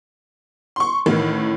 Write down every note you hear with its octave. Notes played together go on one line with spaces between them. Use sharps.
C6 C#6
A1 A2 D#3